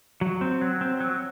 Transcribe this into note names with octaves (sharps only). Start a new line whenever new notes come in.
F#3
C4
F#3
C4
F#3